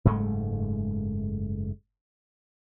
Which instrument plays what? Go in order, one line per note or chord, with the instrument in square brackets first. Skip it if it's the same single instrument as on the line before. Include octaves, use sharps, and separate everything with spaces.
[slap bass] F#1 G#2 G#3 A3